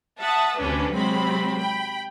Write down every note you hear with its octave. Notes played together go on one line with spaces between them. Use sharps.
E5 F#5 A5 D#6
D2 C3 C#4 D4 B4
C3 F#3 G#3 C4 B5
G5 B5